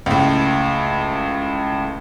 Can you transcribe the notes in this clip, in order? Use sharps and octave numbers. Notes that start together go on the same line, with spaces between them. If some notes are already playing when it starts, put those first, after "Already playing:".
C#2 A2